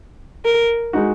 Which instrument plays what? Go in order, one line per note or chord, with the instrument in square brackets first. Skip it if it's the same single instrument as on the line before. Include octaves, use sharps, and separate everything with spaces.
[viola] A#4
[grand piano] G#3 D#4 F#4